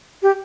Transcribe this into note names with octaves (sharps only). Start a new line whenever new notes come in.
G4